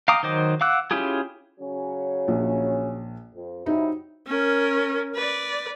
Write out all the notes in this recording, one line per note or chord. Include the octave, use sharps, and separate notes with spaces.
F5 G5 A#5 D6 D#6
D#3 F#3 C5 D#5 D6
F5 F#5 D6 E6 F#6
C#4 E4 F4 G4 G#4
C#3 F#3 C#4
A#1
F2
C3 F#3 D#4 E4
C#4 A#4
B4 D5